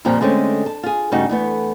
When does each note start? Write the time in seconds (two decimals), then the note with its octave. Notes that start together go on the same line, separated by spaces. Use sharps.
0.05 F2 A#2 D#3 F3 G3
0.21 D3 G#3 A3 C4 C#4
0.66 A5
0.83 F4 G#4
1.12 G2 C#3 A3 D#4 F#4
1.29 E2 A3 B3